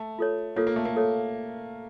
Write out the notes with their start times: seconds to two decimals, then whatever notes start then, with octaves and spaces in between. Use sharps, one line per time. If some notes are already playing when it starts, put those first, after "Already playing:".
Already playing: A3
0.19 F4 A4 C#5
0.56 A#3 F4 A4 C#5
0.67 A#3
0.76 A3
0.85 A#3
0.95 F4 A4 C#5